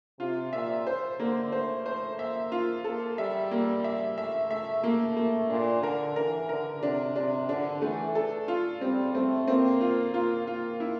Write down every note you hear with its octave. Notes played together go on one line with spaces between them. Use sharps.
C3 F4
A#2 E5
C5
D3 A#3
A3 C5
C5
A#3 E5
F4
A#3 A4
G3 E5
A#3
E5
A3 E5
A3 E5
A3 A#3
A#3
A#2 D4
D3 A#4
E3 A#4
D3 A#4
C3 D4
C3 D4
D3 D4
E3 A3
A4
F4
G3 C4
A3 C4
A#3 C4
F4
A#3 F4
A#3 F4
E4